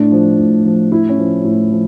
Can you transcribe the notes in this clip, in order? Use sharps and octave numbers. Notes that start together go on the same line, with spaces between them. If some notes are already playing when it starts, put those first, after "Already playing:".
Already playing: A2 D4
F3
A2
F3
A2 E4
C#4
F3
A2 E4
F3